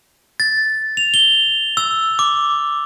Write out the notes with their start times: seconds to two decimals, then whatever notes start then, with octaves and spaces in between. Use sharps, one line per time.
0.40 A6
0.97 F7
1.14 G7
1.77 E6
2.19 D6